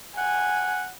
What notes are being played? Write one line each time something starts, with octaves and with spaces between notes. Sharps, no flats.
F#5 G#5